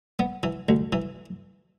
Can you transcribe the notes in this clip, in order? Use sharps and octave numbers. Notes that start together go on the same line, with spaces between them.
B3
E3
D2
E3